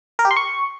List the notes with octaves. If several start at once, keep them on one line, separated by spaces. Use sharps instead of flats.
A#4
G4
C6
C#6